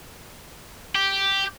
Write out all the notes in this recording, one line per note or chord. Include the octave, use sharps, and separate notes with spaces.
G4